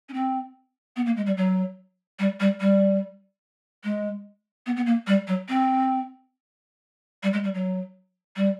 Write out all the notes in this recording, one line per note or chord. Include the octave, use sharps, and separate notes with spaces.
C#4
C4
B3
A#3
G#3
G3
F#3
G3
G3
G3
G#3
B3
B3
A#3
G3
F#3
C4
G3
G#3
G3
F#3
G3